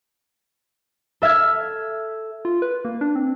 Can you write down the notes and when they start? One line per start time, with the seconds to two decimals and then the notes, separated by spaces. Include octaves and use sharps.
1.22 A4 E5 F6 G#6
2.45 F4
2.62 B4
2.85 A#3
3.01 D4
3.15 C4